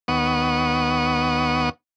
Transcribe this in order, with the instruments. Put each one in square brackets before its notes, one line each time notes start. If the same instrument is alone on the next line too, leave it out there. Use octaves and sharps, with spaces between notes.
[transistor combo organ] D#2 B3 F#5 C#6 D#6